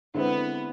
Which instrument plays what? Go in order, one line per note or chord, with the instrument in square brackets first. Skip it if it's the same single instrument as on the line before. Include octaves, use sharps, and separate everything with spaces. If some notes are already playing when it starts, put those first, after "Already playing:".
[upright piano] D3 G#3 C4 E4 [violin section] B3